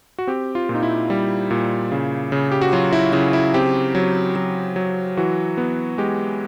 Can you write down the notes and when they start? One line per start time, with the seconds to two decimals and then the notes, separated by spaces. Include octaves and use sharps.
0.18 F#4
0.27 C4 G4
0.55 F4
0.69 A#2
0.74 D#4
0.83 E4
1.10 G3
1.51 A#2
1.92 C#3
2.32 C#3
2.52 G4
2.62 F#4
2.73 F#3 F4
2.93 E4
3.13 C#3 E4
3.33 E4
3.54 C4 G4
3.95 F#3
4.36 F#3
4.76 F#3
5.17 E3 F#4
5.58 B3
5.98 G#3 G4